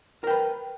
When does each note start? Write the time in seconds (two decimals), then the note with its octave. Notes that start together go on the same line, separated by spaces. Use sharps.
0.24 A#4
0.27 G5
0.30 B4